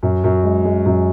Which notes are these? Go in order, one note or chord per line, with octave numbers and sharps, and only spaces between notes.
F#2
F#2
G#3
G#3
F#2